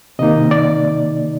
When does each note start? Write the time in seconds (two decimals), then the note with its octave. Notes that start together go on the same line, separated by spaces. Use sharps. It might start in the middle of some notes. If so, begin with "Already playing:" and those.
0.19 C3 D#3 A#3 D#4 D#5
0.51 D5